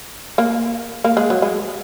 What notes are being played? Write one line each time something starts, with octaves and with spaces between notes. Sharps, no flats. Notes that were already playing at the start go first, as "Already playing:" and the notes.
A#3
A#3
G#3
F#3
G#3